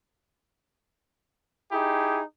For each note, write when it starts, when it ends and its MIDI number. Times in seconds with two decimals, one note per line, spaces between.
1.71 2.21 63
1.71 2.21 64
1.71 2.21 67
1.71 2.21 68